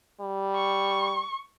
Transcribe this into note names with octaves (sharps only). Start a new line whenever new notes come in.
G3
C#6